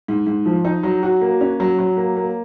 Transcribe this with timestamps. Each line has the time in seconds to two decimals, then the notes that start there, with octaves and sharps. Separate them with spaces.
0.08 G#2
0.27 G#2
0.46 F3
0.65 D#4
0.83 F#3
1.03 F#4
1.21 A#3
1.41 C#4
1.60 F#3
1.79 F#3
1.97 A#3
2.16 A#3